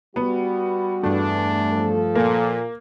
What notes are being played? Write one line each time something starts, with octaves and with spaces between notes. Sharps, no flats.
G3 B3 F#4
E2 G2 A3 D4
F3 A4
A#2 A#3